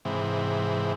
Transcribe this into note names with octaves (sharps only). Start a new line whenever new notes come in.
G#2 C3 E3